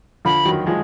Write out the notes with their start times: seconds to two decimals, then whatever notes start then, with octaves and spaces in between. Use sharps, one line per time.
0.25 D3 F3 B5
0.45 D#3 F#3
0.67 F3 G#3